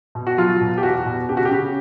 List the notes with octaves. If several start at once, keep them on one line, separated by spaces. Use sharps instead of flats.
B2
F#4
F#3 F4
B2
G4
E2 F#4
B2
C#3 G4
F#4
G4
C#3